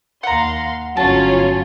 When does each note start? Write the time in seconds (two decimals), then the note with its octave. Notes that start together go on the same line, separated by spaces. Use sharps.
0.23 D#2 F5 F#5 A#5 C6
0.97 G1 F#3 C#4 F4 A5